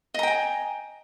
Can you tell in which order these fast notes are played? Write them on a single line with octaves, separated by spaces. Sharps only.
D#5 A#5 G5 G#5